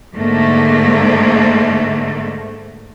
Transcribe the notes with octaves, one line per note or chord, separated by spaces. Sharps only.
G#2 D3 A3 A#3